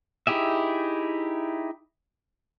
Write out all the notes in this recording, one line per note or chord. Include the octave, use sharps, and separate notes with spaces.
D#4 E4 G4 G#4 E5